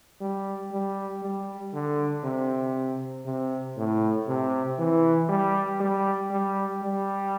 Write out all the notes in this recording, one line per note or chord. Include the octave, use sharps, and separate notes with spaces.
G3
G3
G3
D3
C3
C3
A2
C3
E3
G3
G3
G3
G3